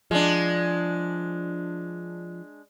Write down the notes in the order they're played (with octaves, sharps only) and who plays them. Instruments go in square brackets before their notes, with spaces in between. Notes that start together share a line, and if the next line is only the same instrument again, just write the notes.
[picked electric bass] F3 [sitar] G#3 D4